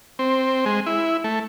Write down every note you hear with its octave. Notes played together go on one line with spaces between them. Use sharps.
C4
G#3
E4
A3